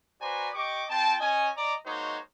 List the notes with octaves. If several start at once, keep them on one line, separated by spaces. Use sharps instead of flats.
F#4 B4 C5 D5 G#5 A#5
G4 D#5 G5 C#6 D6
C4 F4 G5 A5
C#4 C#5 D#5 G#5
D5 D#5 A#5 D6
G#3 A#3 D#4 F#4 C5 C#5